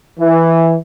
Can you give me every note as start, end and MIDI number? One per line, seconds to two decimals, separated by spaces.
0.20 0.76 52